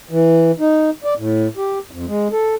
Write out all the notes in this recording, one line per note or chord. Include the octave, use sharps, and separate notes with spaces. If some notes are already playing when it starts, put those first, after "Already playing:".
E3
D#4
D5
A2
G4
F2
G#3
A4